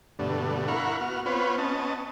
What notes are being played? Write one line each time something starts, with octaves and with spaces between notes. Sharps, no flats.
G2 B2 D3 A3
E4 A#4 F5 F#5 B5 C#6
B3 F#4 F6
B3 C4 F4 B4 C#5
B3 C#4 D#5 A5